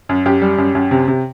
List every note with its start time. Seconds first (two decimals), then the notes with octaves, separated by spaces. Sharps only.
0.09 F#2
0.25 F#2 G4
0.42 G3
0.58 F#2
0.75 F#2
0.91 C3
1.08 C3